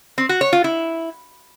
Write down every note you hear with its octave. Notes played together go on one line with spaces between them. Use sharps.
C4
F#4
C#5
F4
E4